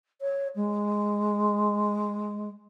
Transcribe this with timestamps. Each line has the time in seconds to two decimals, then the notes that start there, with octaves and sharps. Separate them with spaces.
0.21 C#5
0.56 G#3